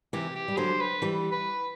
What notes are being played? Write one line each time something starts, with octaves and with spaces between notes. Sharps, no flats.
C3 E3 G4
G4
G3
D3 F#3 C5
B4
E3 G3
B4